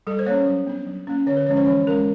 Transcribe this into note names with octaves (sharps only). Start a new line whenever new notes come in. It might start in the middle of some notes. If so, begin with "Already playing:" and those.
G3 A4
C5
A#3 C#4 C#5
F#3
B3 D4
F#3
A#3 C#4
D3 C#5
B4
F3 G#3 C#4 C#5
C5
E3 C#5
G#3 C#4 A#4